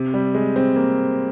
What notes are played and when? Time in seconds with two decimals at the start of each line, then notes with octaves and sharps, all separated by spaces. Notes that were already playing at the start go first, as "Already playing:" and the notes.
Already playing: C3
0.14 G3
0.34 G#3
0.56 C4
0.76 A#3